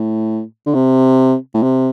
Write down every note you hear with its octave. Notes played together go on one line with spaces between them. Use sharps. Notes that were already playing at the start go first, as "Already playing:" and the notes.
Already playing: A2
D3
C3
A2
C3